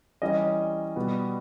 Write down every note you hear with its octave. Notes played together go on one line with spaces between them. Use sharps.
E3 G3 C#4 D#5
B2 G3 B3